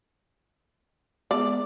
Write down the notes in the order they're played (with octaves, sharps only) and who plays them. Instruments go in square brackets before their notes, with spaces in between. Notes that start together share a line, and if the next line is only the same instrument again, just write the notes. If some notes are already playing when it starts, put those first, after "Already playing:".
[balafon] G#3 B3 G#4 [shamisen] D5